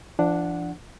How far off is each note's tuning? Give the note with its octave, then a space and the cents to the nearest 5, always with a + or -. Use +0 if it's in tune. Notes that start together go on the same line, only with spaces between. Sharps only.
F3 -35 D4 +0 F#5 +0